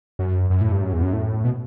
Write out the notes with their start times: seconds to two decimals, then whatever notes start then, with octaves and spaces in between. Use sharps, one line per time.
0.19 F#2
0.50 F#2
0.61 A2
0.72 G2
0.82 F#2
0.93 E2
1.03 F#2
1.13 A2
1.44 B2